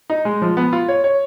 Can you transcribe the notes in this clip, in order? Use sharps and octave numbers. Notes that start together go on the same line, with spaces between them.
D#4
G#3
F3
B3
F4
C#5
C#5